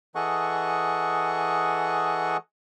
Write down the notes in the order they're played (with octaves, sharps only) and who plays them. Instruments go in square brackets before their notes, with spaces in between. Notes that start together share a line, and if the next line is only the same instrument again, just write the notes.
[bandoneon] E3 G#4 A4 D#5 F#5 C#6